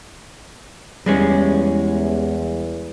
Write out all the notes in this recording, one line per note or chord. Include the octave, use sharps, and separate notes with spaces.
E2 G3 G#3 C#4